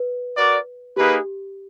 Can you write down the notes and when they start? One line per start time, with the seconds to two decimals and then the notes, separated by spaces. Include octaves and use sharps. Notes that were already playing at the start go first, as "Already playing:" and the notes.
Already playing: B4
0.37 F#4 A#4 D5
0.96 A#3 D#4 G4 G#4 B4